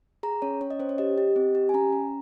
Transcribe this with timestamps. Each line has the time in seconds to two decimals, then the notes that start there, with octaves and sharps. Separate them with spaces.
0.23 G#4 A#5
0.42 C#4 C#5
0.61 C#4 C#5
0.70 D#5
0.79 C#4 C5
0.89 C#5
0.98 G4 D#5
1.18 G4
1.36 C4
1.55 G4
1.69 G#5
1.74 C#4 A#5
1.92 C#4